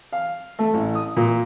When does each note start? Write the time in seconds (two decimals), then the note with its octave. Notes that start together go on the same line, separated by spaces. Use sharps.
0.12 F5
0.59 A3
0.74 A1
0.95 D#6
1.16 A#2